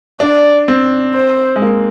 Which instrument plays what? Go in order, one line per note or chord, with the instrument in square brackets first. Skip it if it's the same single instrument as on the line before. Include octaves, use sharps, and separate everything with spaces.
[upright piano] D4 [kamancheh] D5
[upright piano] C4
[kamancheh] C5
[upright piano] G#3
A#3